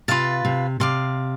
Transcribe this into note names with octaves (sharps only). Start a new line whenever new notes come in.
C3 F4 B4 F5 A5
C3
C3 D5 F5 C6